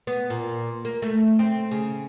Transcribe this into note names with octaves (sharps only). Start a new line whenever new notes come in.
B3
A#2
A#3
A3
C4
C#3